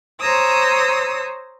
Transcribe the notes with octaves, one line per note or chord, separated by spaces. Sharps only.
C5 C#5 A#5 D#6 E6